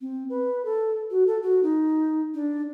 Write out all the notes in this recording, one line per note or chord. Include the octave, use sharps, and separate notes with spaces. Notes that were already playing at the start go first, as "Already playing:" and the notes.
C4
B4
A4
F#4
A4
F#4
D#4
D4